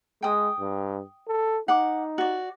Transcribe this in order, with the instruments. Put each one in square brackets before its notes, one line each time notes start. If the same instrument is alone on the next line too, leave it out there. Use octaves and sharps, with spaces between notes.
[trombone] G#3 [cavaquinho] G5 D#6
[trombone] G2
A4
[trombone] D#4 [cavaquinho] F#5 D6
[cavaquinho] F#4 D5